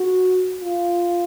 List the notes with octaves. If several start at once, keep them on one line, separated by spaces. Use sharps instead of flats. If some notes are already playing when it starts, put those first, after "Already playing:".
Already playing: F#4
F4